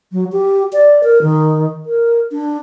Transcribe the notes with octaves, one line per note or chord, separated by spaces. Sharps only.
F#3
G4
D5
A#4
D#3
A#4
D4